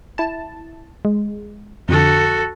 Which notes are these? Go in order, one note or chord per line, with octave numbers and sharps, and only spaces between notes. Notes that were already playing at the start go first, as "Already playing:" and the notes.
E4 A5
G#3
F2 D3 F#4 A4